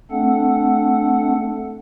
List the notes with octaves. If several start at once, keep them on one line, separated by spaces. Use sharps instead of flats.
A3 C4 D4 A4 F#5